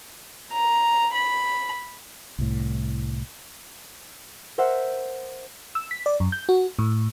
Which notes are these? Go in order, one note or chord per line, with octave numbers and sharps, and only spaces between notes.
A#5
B5
C2 A2
A#4 C5 E5 F#5
E6
B6
D5
F#2
G6
F#4
A2